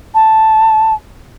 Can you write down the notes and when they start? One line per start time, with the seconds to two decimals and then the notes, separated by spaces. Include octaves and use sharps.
0.14 A5